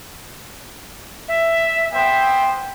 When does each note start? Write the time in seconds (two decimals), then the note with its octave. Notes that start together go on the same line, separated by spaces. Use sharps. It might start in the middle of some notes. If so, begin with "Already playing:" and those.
1.28 E5
1.92 B3 C5 E5 G5